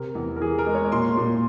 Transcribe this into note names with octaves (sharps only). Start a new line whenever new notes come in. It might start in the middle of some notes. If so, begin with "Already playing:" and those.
Already playing: C3 A#4
E2
A#4
E3 G#4
A#4
G#3
C#5
A#2 C6
A#2